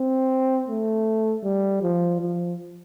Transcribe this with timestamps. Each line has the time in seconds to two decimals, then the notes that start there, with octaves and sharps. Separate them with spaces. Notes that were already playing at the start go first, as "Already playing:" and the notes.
Already playing: C4
0.68 A3
1.44 G3
1.82 F3
2.21 F3